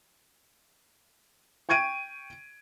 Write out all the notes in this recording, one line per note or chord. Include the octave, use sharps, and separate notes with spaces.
G5 C#6 G#6 D7 D#7